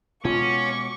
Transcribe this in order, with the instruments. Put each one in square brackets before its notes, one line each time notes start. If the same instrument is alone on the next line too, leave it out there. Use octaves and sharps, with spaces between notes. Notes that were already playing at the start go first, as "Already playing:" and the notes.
[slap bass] B2 G#3 [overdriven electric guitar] C#4 [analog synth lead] F4 [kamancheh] C#6 D6